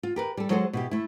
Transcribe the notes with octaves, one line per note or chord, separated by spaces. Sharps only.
F4
G4 A#4 B4
G3 A4
F#3 G#3 A4 C5 D#5
B2 E4 G4
A3 E4